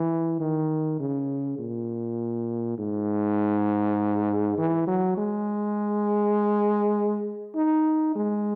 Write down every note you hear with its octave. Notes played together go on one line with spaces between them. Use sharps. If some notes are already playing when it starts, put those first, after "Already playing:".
Already playing: E3
D#3
C#3
A#2
G#2
E3
F#3
G#3
D#4
G#3